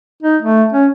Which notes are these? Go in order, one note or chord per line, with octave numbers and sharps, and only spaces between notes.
D#4
A3
C#4